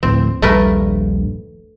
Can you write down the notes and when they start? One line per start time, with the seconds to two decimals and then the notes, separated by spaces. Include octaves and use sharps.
0.03 D2 A2 F3 C4
0.42 D#1 A#1 G2 A3 A#4 B4